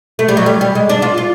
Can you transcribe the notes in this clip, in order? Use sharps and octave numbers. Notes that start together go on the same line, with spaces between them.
A3
G3
F#3
G3
G3
G#3
D4
F4
F4